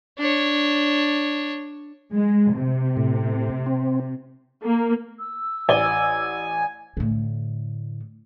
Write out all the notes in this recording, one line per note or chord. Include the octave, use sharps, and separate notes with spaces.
D4 C#5
G#3
C3
A2
C4
A#3
E6
A1 D5 G#5 G7
A2 D3